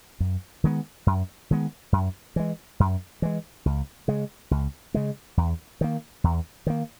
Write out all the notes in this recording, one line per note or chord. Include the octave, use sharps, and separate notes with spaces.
F#2
D#3 G#3 B3
F#2
D#3 G#3 B3
F#2
E3 G#3
F#2
E3 G#3
C#2
C#3 G#3
C#2
C#3 G#3
E2
D#3 A#3
E2
D#3 A#3